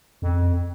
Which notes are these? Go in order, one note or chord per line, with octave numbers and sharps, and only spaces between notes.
F2